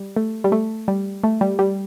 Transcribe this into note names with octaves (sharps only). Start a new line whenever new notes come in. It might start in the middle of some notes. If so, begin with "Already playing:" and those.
Already playing: G3
A3
G3
A3
G3
A3
G3
G3